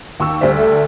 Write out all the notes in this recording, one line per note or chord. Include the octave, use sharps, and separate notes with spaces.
D#2 C#6 E6
D2 G3 C5 E5
A4